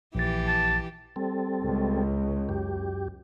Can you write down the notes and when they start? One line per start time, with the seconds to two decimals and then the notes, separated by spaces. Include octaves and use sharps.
0.15 A#1 E3 G4 A6
0.47 A5
1.16 G3 C4 A4
1.64 C#2
2.49 F#2 G4